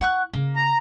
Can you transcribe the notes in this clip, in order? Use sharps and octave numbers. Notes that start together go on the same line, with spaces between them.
E4 F#5 C#6 F#6
C#3 A#3
A#5